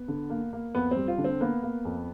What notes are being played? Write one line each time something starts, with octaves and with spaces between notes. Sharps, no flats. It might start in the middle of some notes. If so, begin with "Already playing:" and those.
Already playing: B3
D3
A#3
A#3
F2 B3
G3 C4
F4
D3
C4
A#3 B3
A#3
F2